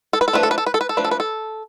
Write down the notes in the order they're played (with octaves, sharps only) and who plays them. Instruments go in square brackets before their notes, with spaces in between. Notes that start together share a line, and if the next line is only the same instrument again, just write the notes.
[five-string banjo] A4
B4
A4
F3 A3 D4 B4
A4
B4
A4
B4
A4
B4
A4
F3 A3 D4 B4
A4
B4
A4